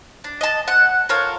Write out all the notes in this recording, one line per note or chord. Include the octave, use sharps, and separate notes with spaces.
D4
D#5 A5
F#5
F4 A4 A#4 C#5